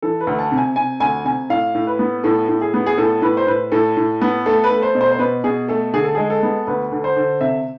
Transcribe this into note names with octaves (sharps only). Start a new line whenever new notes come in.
E3 A4
B4
D2
A5
C3
G#5
C3 G#5
D2 G#5
C3 G#5
A2 F5
A2
B4
B3
A2 A4
A2
G#4
B3
G#4
A2 A4
A2 B4
C5
A2 B4
A2 A4
A2
B3
A3 A4
B4
A3
C5
B2
C5
C5
B2 B4
B2 G#4
A3 A4
D3 G#4
A4
G#3 G#4
A4
B3
D2 B4
D3
C5
D3
C3 E5